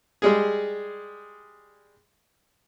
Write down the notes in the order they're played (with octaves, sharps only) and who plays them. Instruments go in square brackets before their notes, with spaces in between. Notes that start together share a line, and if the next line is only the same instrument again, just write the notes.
[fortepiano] G3 G#3 G#4